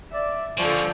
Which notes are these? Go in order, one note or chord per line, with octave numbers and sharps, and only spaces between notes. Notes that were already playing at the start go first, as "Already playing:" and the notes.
D5 E5
D3 F3 G3 A#3 D5 G#5 C6 C#6